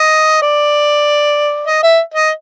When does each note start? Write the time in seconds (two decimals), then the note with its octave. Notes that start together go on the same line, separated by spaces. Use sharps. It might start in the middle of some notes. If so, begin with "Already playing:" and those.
Already playing: D#5
0.42 D5
1.67 D#5
1.84 E5
2.14 D#5